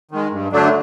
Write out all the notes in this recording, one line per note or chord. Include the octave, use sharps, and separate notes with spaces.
D#3 G#3
G2
D3 F#3 A3 D4